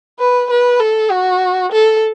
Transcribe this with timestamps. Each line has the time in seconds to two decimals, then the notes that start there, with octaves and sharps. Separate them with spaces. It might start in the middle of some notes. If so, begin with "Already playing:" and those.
0.19 B4
0.50 B4
0.80 A4
1.11 F#4
1.72 A4